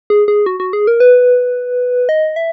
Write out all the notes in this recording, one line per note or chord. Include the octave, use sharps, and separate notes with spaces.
G#4
G#4
F#4
F#4
G#4
A#4
B4
D#5
E5